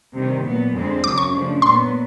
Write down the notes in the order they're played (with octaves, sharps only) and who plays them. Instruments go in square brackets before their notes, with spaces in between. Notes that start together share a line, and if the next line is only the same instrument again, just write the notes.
[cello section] C3 D#3 G3
A#2 F#3 B3
F2 D3 F3 G#3 C4
[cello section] F#2 C#3 F#3 [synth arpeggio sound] D6
[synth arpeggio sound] C#6
[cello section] C#3 F3 A3 D4
[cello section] A#2 F#3 B3 [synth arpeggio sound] C6